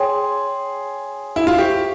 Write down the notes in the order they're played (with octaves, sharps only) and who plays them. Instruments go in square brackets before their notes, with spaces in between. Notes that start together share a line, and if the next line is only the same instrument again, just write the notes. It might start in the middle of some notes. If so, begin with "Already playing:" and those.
Already playing: [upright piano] G#4 [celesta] C#5 G5 C6
[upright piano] E4
F4
[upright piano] G4 [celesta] C5 G5 C#6